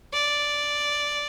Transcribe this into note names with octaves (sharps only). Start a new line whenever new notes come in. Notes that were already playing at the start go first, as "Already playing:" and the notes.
D5